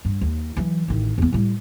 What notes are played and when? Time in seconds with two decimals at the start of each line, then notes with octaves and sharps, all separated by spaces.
0.05 G2
0.21 D#2
0.57 E3 F#3
0.88 A1 D#3
1.18 E2 B3
1.32 A2 G3